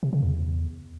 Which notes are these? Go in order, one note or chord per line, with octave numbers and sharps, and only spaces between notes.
C3
C#3
E2